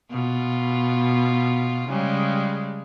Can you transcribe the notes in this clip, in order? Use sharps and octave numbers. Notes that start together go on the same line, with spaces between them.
B2 F4
C#3 G3 G#3